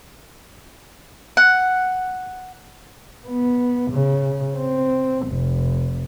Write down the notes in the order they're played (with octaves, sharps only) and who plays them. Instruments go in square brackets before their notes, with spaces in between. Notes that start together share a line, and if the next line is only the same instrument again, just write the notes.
[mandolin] F#5
[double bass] B3
C#3
C4
F1